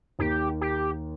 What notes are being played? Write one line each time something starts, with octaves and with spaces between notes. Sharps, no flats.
D#2 D#3 A#3 G4
G4